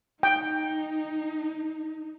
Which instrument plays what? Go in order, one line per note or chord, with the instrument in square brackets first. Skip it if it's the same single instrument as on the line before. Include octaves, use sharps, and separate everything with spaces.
[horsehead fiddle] D#4 [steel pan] G5